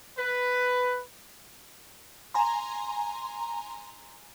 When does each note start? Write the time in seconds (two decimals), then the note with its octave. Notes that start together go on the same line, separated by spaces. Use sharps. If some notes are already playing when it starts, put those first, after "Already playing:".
0.18 B4
2.34 G#5 A#5 C6